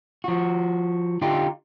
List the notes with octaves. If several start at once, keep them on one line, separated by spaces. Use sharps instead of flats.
F3 F#4
D3 D#4 F4 G4